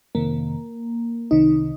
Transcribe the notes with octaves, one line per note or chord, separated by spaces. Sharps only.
F2 C3 D#3 A#3
C2 C3 D#3 D#4